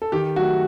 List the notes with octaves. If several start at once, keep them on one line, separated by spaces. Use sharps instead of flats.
A4
D#3 G4
F#3 A3 F#4